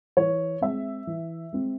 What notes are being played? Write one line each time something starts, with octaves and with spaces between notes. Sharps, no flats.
E3 C#5
G#3 C4 E5
E3
G#3 C4